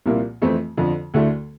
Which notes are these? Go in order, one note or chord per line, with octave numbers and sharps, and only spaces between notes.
C2 A#2 F3 A#3 E4
F2 E3 A3 C4 E4
F2 D3 F3
D2 D3 A3 E4